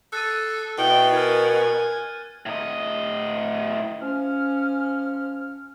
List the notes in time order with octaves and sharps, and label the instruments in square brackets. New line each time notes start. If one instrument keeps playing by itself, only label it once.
[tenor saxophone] A4 [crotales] F#6 A6 D#7
[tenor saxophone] B2 [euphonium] E4 [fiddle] G5
[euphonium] A#4 [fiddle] G#5 [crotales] F6 G#6
[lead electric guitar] A2 D#5
[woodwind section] F3 C#4 F6